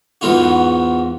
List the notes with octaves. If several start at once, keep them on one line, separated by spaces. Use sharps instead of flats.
E2 G#2 B3 F4 F#4